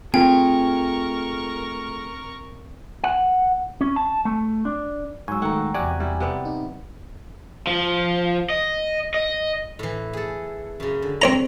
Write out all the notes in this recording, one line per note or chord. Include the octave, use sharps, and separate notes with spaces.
A3 C4 F4 G#4 A#4 G5 C#6
F#5
C#4
A5
A3
D4
G#2 F#3 G#5 C#6 E6
D#3 A3 F#5 G5 A#5
E2 C3 F#4 G4 D5 G#5
G3 E4
C3 B3 D5
D#4
F3
D#5
D#5
A2 E3
G#4 A4
F#2 C#3
D3
C4 C#5 A#5